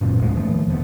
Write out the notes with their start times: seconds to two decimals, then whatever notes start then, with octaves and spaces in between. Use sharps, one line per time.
0.01 F#1 F#2 A#2 C#3
0.21 D#2 A2 G#3 C#4
0.37 D#3 F3 A3
0.68 E1 F3 B3